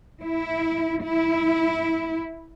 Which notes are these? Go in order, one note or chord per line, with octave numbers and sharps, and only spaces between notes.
E4
E4